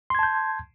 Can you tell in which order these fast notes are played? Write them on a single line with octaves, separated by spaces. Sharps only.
C6 G#6 A5 G6